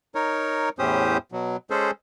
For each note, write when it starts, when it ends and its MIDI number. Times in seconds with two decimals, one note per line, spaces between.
0.15 0.69 63
0.15 0.69 70
0.15 0.69 73
0.79 1.18 40
0.79 1.18 45
0.79 1.18 61
0.79 1.18 67
0.79 1.18 72
0.79 1.18 87
1.32 1.57 47
1.32 1.57 54
1.70 1.91 56
1.70 1.91 61
1.70 1.91 68
1.70 1.91 69
1.70 1.91 72